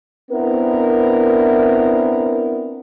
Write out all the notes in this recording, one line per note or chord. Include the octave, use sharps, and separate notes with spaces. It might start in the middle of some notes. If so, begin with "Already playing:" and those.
B3 C4 D4 E4 A#4